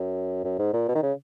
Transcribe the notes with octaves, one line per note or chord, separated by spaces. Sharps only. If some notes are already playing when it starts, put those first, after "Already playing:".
Already playing: F#2
F#2
G#2
A#2
B2
D#3
C#3